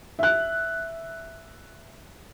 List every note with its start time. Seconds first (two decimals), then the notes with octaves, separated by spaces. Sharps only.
0.19 E5 F#6